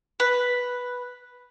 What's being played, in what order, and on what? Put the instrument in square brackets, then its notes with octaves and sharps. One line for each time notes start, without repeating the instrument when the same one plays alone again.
[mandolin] B4